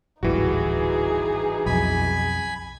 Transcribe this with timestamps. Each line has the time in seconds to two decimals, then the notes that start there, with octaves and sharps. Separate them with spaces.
0.23 D1 G#1 E3 G3 D#4 F#4 G#4
1.66 B1 F2 G#5 B5